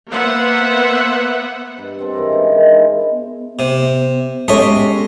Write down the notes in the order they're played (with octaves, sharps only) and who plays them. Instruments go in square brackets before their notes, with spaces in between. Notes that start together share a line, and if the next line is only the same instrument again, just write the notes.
[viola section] A#3 B3 C5 E5 F#5
[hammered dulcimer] G2
C4 G4 A4
G#2 E3 A#4
C#4 D#4 E4
D#3 G#3
D4 E4 F4 C5
[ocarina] B3
[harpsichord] C3
[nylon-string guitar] G#3 C#4 G4 [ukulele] A4 C#5 [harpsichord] D#5 E5 C6